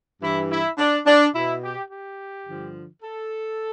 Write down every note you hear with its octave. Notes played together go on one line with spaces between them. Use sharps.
G2 E3 E4
E4
D4
D4
B2 E4
G4
G4
G2 D3 F3
A4